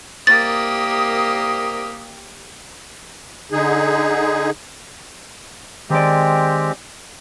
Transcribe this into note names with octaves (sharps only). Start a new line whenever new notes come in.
C2 A#3 G4 A#4 D#6 A6
D3 D#4 G#4
D#3 G#3 C4 G4 D5